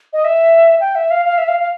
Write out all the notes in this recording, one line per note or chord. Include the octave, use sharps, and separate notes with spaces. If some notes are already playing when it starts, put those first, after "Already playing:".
D#5
E5
G5
E5
F5
F5
E5
F5
F5